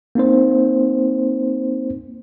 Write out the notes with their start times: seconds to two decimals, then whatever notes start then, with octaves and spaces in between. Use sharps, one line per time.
0.15 A#3 C4 D#4 C5